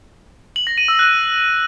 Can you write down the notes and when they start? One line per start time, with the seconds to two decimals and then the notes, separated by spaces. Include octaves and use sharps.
0.56 F#7
0.67 A#6
0.78 D#7
0.88 E6
0.99 F#6